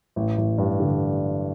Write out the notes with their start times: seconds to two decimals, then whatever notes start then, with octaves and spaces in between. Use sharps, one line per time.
0.16 A1
0.38 A1
0.58 G2
0.80 D3